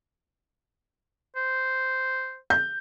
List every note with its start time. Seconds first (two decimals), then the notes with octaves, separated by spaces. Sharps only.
1.36 C5
2.50 G6